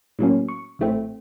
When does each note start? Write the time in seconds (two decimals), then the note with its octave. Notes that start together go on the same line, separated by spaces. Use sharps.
0.19 A2 F#3 A#3 C#4
0.49 C#6
0.79 A#1 A2 A3 C4